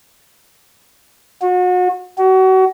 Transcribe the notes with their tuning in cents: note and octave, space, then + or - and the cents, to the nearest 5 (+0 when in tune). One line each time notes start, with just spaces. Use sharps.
F#4 -35
F#4 +30